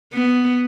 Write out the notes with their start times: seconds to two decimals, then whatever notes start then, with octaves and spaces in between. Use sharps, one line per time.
0.14 B3